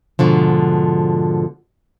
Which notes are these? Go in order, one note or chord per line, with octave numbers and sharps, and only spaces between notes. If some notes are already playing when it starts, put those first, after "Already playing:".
G#2 B2 D3 F3